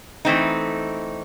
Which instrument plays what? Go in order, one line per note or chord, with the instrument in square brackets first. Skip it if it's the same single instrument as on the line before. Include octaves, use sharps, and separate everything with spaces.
[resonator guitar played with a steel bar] E3 A3 C4 D#4